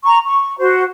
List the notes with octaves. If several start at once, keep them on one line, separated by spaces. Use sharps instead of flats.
A#5 C#6
C#6
F#4 C5